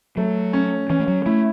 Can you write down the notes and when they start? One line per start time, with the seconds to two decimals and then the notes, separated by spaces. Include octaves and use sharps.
0.17 F#3 A3
0.53 C#4
0.90 E3 C#4
0.99 A3
1.08 F#3
1.26 A3 E4